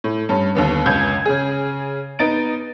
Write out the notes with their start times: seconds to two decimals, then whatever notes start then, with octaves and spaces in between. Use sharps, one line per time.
0.04 A2
0.29 G2 C#4
0.55 D#2 D3 B3
0.86 C#2 F#2 G6 G#6
1.25 C#3 G#4
2.19 B3 D#4 A6 D7